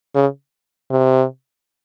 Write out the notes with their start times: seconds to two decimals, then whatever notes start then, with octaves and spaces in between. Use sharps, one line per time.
0.15 C#3
0.91 C3